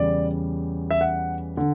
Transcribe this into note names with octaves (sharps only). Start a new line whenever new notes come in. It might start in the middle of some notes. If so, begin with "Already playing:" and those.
Already playing: E2 C#3 G3 D5
E5
F#5
D3